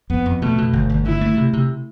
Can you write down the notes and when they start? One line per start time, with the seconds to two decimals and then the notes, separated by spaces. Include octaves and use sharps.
0.10 F2 B3
0.26 F2
0.42 B2 A3
0.58 B2
0.73 G1
0.90 G1
1.05 D3 E4
1.21 A3
1.37 C3
1.53 C3